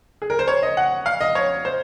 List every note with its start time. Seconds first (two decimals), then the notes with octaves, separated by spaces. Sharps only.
0.22 G#4
0.30 A#4
0.39 C5
0.48 C#5
0.63 D#5
0.77 F#5
1.06 F5
1.21 D#5
1.35 C#5
1.65 C5